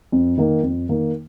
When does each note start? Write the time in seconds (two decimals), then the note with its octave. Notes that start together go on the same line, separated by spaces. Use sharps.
0.12 F2
0.38 D#3 A#3
0.63 F2
0.89 D#3 A#3